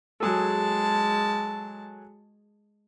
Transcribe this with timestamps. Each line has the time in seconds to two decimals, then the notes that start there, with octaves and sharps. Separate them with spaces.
0.20 F#3 G#3 G#4 A4 A5